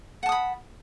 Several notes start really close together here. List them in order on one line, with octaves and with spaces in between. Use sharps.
F#5 A5 D#6 B5